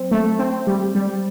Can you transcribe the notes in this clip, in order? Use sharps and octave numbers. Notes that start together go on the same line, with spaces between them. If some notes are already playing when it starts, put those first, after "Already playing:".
Already playing: F#3 C4
A3
C4
G3
G3